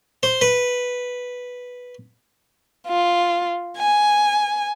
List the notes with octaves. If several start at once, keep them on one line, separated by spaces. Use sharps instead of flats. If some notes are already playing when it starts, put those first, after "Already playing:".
C5
B4
F4
G#5